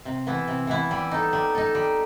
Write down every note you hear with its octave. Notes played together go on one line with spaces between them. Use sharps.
C3
E3 B3 E4
C3
E3 B3 E4
G3
D#4 A4
G3
D#4 A4
G3